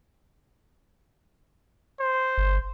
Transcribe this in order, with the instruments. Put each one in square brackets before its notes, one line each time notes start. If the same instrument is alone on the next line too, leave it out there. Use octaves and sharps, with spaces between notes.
[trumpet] C5
[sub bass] G1